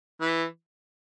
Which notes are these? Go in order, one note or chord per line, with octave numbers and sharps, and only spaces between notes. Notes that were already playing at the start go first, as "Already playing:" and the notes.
E3